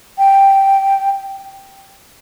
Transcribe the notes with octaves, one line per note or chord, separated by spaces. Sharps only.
G5